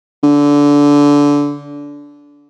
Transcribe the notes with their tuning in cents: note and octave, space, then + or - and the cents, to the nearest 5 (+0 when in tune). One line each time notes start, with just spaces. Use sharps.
D3 -20